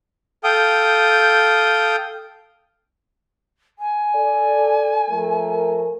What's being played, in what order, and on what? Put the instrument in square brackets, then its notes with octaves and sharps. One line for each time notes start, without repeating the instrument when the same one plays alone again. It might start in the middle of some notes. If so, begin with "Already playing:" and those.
[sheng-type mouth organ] A4 F5 G5 D#6 G6
[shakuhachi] G#5
[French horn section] A4 D5
F3 A3 A#4